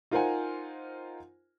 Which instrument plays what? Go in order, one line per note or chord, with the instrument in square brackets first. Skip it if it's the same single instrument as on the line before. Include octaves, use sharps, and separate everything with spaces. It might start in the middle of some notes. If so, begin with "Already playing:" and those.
[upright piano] D#4 F4 A#4 C5 F#5 G#5